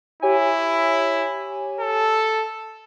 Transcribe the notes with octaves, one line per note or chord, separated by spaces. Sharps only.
E4 G4 C#5 G#5
A4